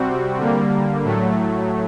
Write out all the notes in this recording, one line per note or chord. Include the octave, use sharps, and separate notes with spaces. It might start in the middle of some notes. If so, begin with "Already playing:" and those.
Already playing: C3 G3 C4 F#4
D3 G3 A#3
A2 F#3 A3